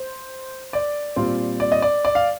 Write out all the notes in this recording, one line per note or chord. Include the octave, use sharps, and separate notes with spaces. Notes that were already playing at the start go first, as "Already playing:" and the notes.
Already playing: C5
D5
A#2 G3 C4 F4
D5
D#5
D5
D5
F5